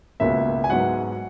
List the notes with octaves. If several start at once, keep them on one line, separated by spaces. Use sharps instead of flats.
C#2 B2 A#3 C#4 E5
G#5
G#2 F#3 B3 F#5